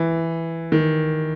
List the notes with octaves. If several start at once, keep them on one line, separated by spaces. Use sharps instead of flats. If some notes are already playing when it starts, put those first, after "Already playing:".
Already playing: E3
D#3